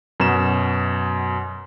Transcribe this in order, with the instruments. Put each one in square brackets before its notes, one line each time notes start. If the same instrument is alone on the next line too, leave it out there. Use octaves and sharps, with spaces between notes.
[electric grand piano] F#2 B2 E7